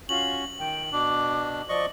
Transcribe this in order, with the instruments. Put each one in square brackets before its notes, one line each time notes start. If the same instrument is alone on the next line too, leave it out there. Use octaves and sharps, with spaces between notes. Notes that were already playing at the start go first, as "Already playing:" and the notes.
[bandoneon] C#4 F#4 [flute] F4 [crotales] F#7
[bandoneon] D#3 [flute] G5
[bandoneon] B2 D4 [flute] D6
[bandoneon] F3 D#5 C#6 [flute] D5